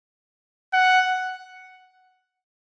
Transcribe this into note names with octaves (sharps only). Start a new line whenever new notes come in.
F#5